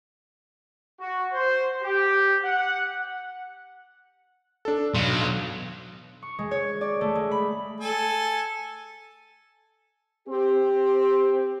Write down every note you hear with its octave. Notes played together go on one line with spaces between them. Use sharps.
F#4
C5
G4
F#5
D4 A4
B2 F#3 F5 C6
C#6
G#3
C#5
D5
A3
G#3
B5
A4 G#5
C4 G4